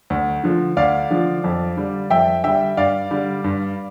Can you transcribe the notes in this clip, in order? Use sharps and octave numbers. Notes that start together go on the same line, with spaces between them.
D2
D3 F3
D2 D5 F5
D3 F3
F2
D3 G3
F2 E5 G5
D3 G3 E5 G5
G2 D5 F5
D3 G3
G2